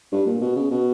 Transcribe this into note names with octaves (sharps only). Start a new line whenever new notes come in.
G2
A#2
B2
C#3
B2